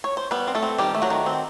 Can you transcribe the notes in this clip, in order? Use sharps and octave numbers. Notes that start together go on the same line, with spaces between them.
C#5
C5
G3 B3 B4
C4
A3 A4
C4
D#3 G3 G4
A3
F#3 F#4
D#3
C4